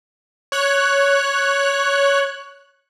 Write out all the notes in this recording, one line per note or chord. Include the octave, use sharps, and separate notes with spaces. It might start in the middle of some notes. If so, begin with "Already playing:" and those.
C#5 F#6